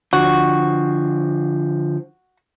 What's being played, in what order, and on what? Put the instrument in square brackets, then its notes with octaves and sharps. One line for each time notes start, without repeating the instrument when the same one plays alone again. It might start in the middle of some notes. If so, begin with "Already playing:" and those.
[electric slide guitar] D3 F3 [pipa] F#4